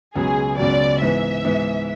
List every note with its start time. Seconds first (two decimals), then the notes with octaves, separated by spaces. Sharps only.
0.15 C#2 B2 F#3 G#4
0.58 C#2 B2 F#3 D5
1.02 G#2 E3 B3 E5
1.45 G#2 E3 B3